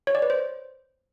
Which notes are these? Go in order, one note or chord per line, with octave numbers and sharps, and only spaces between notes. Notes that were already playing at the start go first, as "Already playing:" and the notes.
C#5
D5
B4
C5